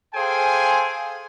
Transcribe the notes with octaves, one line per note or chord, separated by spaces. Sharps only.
G#4 A4 C5 F5 G5 G#5